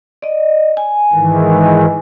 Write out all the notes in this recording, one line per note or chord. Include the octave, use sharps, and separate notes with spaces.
D5 D#5
G#5
G#2 D#3 E3